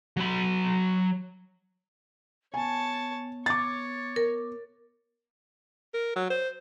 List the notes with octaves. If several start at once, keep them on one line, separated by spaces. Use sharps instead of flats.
F#3 B5
B3 C#5 G#5 A5
C#5 D6 A6
A#4
A#4
F#3
C5